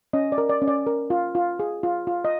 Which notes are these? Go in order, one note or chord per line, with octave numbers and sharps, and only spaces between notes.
C#4 D#5
D5
A#4
D5
C#4
D5
A#4
F4
F4
G#4
F4
F4
D#5